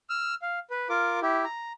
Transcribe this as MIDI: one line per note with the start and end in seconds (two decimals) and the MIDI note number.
0.09 0.35 88
0.09 0.35 89
0.42 0.59 77
0.70 0.88 71
0.89 1.20 65
0.89 1.20 70
0.89 1.20 86
1.22 1.44 64
1.22 1.44 67
1.45 1.73 82